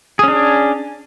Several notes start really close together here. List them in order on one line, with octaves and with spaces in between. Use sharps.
G#4 C#4 D4